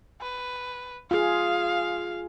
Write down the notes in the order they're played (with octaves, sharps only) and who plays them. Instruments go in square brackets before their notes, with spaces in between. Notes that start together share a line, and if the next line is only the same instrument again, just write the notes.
[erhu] B4
[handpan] F4 G#4 [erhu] F5